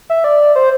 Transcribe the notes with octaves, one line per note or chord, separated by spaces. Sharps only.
E5
D5
C5